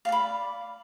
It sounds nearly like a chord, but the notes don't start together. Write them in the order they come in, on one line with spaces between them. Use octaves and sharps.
F5 D5 B5